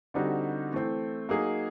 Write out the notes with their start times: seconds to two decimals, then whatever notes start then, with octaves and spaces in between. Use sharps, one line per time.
0.14 D3 G3 C4 D#4 F#4
0.72 E3 A3 C4
1.29 F#3 A#3 D#4 G#4